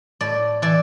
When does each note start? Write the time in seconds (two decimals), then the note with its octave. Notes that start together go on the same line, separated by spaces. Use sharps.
0.21 A2 D5
0.62 E3 D5